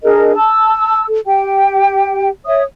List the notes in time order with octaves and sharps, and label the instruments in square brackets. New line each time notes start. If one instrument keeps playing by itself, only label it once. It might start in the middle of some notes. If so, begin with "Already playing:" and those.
[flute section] D4 G#4 A#4 D#5
A5 E6
A4
G4 G5
C#5 E5 D#6